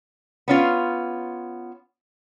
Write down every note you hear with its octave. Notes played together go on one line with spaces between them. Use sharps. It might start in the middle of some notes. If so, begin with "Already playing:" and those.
B3 C#4 F4